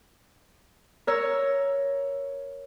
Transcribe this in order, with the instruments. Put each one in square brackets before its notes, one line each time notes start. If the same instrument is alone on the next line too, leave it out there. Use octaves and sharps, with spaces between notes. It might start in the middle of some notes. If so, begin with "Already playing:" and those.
[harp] A#4 C#5 E6